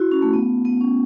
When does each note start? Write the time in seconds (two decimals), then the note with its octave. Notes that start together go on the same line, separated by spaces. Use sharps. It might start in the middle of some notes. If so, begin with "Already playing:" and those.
Already playing: E4 F#4
0.12 C#4
0.22 A3
0.33 B3
0.65 B3
0.81 C#4